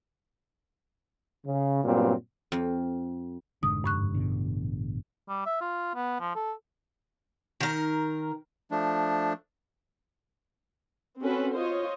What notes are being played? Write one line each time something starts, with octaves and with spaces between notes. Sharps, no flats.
C#3
G2 A#2 F#3 B3 C4
F2
F1 G#2 D3 D#6
G2 C#6 F#6
A1 B2 D3
G3
E5
F4
B3
F3
A4
D#3 A#4
F3 A3 D4
C4 C#4 F#4 A4 B4
F4 C5 C#5 D#5